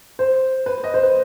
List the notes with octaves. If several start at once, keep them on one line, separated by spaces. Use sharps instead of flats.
C5
B4
D#5
C5
B4